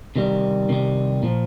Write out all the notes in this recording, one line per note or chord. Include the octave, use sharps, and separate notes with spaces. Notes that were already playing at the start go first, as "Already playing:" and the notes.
C3 D#3 G3
C3 D#3 G3
A#2 F3